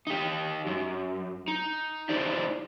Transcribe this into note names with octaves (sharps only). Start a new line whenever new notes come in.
D#4 G4
F#2
D#4
D#4 E4 G4 C5 D5 D#5